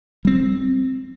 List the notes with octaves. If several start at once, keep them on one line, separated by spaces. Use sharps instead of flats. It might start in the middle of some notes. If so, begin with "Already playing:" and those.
G3 C4